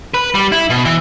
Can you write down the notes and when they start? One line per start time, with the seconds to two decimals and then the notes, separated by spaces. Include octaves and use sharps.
0.14 B4
0.35 G3
0.52 E4
0.70 B2
0.85 E3